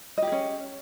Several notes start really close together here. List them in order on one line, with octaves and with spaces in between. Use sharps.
D#5 G4 G#4 C#4